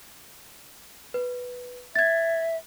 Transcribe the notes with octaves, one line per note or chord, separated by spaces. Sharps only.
B4
E5 G#6 A6